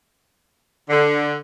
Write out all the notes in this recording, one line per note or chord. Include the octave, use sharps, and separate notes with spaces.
D3